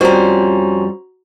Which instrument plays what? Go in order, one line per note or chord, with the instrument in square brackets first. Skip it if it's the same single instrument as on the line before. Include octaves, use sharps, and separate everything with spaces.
[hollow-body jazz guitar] F2 F3 G3 [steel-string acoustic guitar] C#4 C5 [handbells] F#4 A#5